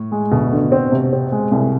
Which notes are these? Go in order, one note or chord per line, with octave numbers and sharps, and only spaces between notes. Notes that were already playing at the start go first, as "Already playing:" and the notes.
Already playing: A2
G#3
D2 B2
D3
C4
C3
C4
G#3
C2